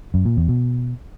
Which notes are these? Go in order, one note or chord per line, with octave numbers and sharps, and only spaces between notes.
F#2
A#2
E2
B2